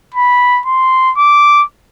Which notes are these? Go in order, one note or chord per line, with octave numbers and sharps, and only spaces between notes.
B5
C6
D6